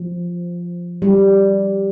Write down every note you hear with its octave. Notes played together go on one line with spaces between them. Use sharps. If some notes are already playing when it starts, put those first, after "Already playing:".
Already playing: F3
G3